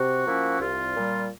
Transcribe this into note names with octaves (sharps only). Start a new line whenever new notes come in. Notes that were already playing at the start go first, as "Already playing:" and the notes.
Already playing: C3 F#4
F3 A#3 C#4 E4
C2 F4
A#2 G3